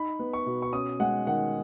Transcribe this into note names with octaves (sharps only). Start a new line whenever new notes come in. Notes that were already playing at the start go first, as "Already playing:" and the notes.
Already playing: D#4 B5
B3
C#6
B2
C#6
C#4 D#6
G#3 F#5
D#3 F#5